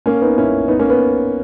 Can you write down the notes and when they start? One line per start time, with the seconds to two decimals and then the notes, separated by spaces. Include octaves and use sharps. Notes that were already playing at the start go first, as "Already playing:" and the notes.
0.06 A#3 C#4
0.22 B3 D#4
0.38 C#4 E4
0.68 B3 D#4
0.79 A#3 C#4
0.90 B3